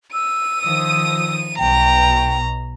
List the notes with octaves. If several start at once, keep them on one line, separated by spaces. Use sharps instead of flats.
E6 D#7
D#3 F3 D#6 E6
B1 B2 G5 A#5